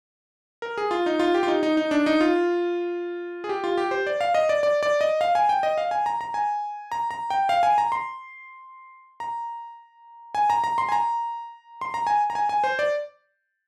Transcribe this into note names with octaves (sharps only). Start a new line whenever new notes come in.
A#4
G#4
F4
D#4
F4
G4
F4
D#4
D#4
D#4
D4
D#4
F4
G#4
G4
F4
G4
C5
D5
F5
D#5
D5
D5
D5
D#5
F5
G#5
G5
D#5
F5
G#5
A#5
A#5
G#5
A#5
A#5
G5
F5
G#5
A#5
C6
A#5
G#5
A#5
A#5
C6
G#5
A#5
C6
A#5
G#5
A#5
G#5
G#5
C5
D5